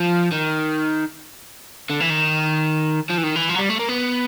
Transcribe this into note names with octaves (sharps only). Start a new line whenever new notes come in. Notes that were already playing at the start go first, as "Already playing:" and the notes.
Already playing: F3
D#3
D3
E3
D#3
F3
E3
D#3
E3
F3
F#3
G3
A3
A#3
B3